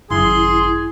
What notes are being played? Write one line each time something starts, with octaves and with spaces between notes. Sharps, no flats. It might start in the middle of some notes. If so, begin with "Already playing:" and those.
G#1 F#2 C#3 E4 G#4 C6